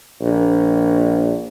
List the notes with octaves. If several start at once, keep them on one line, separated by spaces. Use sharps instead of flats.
A#1